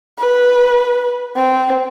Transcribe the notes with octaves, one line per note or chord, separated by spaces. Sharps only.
B4
C4